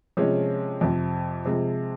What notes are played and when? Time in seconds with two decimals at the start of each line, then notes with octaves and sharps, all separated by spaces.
0.17 C3 F3 G#3 C#4
0.81 F2 C3 F3
1.45 C3 F3 G#3